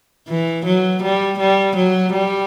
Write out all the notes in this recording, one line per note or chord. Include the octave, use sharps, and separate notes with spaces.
E3
F#3
G3
G3
F#3
G3